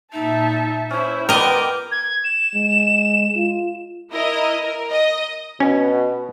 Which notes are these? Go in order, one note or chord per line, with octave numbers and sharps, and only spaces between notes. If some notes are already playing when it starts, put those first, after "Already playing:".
A#2 D#4 E5 A5
C#4 E4 C5
B3 F4 A#4 D5 D#5 G5 D6
G#6
E7
G#3
F4
E4 A#4 D#5
A#4
D#5
B2 C#4